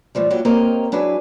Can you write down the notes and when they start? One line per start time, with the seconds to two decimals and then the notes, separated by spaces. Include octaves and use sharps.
0.15 A2 E3 F3 G3
0.30 A#2 F#3 E4 F#4 G4
0.45 A#3 C4 G4 A#4 C#5 D#5
0.92 F#3 D4 E4 G#4 B4 G#5